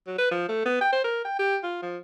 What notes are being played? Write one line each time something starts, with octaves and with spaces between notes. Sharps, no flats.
F#3
B4
F3
A3
B3
G5
C5
A#4
G5
G4
F4
F3